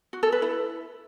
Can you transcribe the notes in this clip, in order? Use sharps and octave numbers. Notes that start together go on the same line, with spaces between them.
F#4
A4
B4
E4